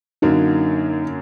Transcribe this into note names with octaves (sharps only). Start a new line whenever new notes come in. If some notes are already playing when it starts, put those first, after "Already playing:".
F#2 D3 F#3 A#3 D#4